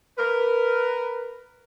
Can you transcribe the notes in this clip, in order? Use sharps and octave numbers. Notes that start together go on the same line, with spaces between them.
A#4 B4